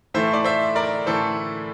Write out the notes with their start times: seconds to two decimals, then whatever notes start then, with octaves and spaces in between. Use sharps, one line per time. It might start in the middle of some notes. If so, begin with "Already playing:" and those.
0.14 A2 E3 A3 C5 E5
0.33 D5
0.44 C5 E5
0.75 A#4 D5
1.07 A2 E3 A3 A4 C5